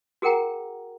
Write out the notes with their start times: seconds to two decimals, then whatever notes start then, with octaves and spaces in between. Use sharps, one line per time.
0.22 F#4 G#4 A#4 F#5 G5 A#5